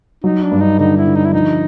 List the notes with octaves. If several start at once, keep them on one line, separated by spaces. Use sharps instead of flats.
F#3 D#4
D4
G2
D#4
D3 D#4
E4
D3
D#4
E4
F3 D#4